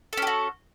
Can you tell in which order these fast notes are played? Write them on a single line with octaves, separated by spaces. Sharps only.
A4 C#4 G4 F#4